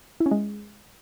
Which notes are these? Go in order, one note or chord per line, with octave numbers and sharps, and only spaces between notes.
E4
C#4
G#3